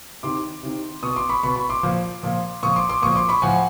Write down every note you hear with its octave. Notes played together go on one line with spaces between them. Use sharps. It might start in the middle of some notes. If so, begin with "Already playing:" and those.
C3 D#3 C6 D6
C3 D#3
B2 C#6 D#6
C6 D6
B5 C#6
B2 B5 C#6
B5 C#6
C6 D6
A#2 F3
A#2 F3
A#2 F3 C#6 D#6
C6 D6
C6 D6
A#2 F3 C#6 D#6
C6 D6
B5 C#6
A2 F3 F#5 G#5